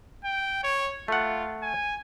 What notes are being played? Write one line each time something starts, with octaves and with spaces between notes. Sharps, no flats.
G5
C#5
A3 F4 F#5
G#5